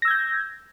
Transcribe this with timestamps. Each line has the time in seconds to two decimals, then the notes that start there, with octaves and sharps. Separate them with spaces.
0.02 A#6
0.05 E6
0.08 G#6
0.10 G6